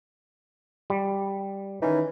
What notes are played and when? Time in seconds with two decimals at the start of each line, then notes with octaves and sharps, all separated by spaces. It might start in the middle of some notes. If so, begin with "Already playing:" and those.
0.90 G3
1.82 D#3 E3 C#4 D#4